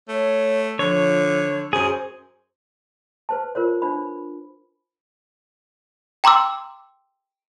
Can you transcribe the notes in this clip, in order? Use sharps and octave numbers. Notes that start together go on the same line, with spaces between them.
A3 C#5
D3 F3 C#5
F#2 G#4 C5
B4 C5 A5
F4 A#4 C5 C#5
D4 C5 B5
G5 A#5 C6 D6 E6